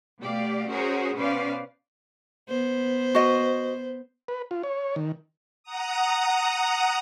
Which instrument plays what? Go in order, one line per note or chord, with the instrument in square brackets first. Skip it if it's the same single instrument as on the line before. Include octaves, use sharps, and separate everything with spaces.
[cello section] B2 A3 G4 D5 F5
C#4 F#4 G#4 A#4 C5 C#5
B2 C#4 B4 C5 D5 F5
[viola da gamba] B3 C5
[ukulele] F#4 D#5
[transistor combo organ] B4
F4
C#5
D#3
[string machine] F#5 A#5 D#6